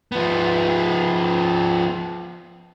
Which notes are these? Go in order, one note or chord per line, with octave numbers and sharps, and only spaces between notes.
F3 B3